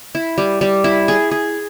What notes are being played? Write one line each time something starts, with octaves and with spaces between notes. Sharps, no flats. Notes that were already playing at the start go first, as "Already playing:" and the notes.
E4
G3
G3
E4
G#4
G#4